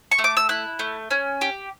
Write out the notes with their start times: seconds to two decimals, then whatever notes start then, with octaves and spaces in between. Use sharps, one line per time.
0.11 C#6
0.18 A3
0.24 D6
0.37 E6
0.49 E4 F#6
0.79 A3
1.11 C#4
1.41 G4